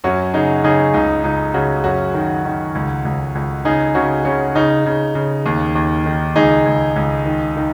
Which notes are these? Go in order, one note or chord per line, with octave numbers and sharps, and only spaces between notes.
F#2 C#4 F#4
C#3 D#4 G#4
C#3 D#4 G#4
C#2 D#4
C#2 D#4
C#3 C#4 F#4
F#2 C#4 F#4
D#3
D#3
C#2
C#2
C#2
C#3 D#4 G#4
C#3 C#4 F#4
C#3 C#4
C#3 D#4
C#3
C#3
D#2
D#2
D#3
C#2 D#4 G#4
C#2
C#2
D#3
D#3